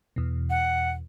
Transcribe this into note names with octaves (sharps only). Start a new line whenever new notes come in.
E2 B2
F#5